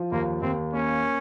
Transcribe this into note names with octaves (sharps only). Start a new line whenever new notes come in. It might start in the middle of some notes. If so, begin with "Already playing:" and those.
Already playing: F3
D#2 A#3
D#2 C4
A#3 C#4